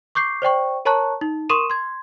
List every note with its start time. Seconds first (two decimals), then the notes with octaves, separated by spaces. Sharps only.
0.15 C#6 D6 G6 C7
0.42 C5 D5 G5 C#6
0.85 A#4 C#5 A5 A#5 C#6 F#6
1.21 D#4
1.49 A#4 C6 C#6 D#6 D#7 E7
1.70 C6 G#6